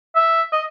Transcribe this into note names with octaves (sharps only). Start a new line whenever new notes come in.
E5
D#5